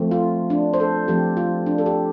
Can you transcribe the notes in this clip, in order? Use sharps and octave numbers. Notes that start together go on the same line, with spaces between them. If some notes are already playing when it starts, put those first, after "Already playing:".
Already playing: F3 A3 C4
F4
D4
C5
A4
F3 A3 C4 G4
F4
D4
A4
G4